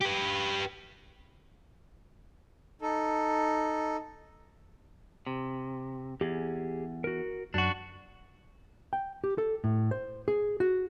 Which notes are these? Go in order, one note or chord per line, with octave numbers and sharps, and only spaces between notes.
G4 B4
D#4 A4
C3
E2 G4 G#4
F#4 A#4
F#2 F#3 D4 F#4
G5
G4
A4
A2
C5
G#4
F#4